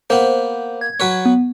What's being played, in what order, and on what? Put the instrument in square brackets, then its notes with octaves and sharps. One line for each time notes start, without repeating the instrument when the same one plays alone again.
[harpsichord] A#3 B3 [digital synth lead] C5
[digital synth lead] G#6
[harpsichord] F#3 B4 C#5
[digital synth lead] B3